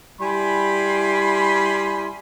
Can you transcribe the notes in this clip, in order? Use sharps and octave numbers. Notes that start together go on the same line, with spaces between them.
G3 E4 G#5 B5 C6